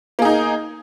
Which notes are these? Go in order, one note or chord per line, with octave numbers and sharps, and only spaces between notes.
A#3 D#4 G#4